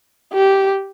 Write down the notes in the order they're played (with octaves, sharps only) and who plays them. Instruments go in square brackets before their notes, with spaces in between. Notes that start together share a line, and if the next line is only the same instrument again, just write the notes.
[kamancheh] G4